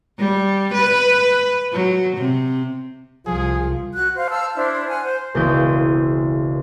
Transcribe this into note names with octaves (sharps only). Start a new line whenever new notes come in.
G3
B4
F#3
C3
C2 F3 G#4
F#4 F#6
C5 F5
A5 E6 F6 G6
D4 E4 C5
F#5 G#5 F6
C5
E1 C#2 C4 E4 D#6 G6